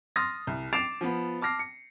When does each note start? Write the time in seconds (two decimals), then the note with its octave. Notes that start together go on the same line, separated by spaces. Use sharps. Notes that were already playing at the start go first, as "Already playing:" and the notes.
0.16 C6 D#6 F6 A6 A#6
0.47 C2
0.73 D6 A6 C7 D7 E7 F7
1.01 F3 B3
1.42 A5 D6 F6 A#6 C7
1.59 C#7